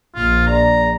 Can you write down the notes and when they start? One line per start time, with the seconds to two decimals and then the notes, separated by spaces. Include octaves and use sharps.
0.15 A#1 F4
0.47 D5 A#5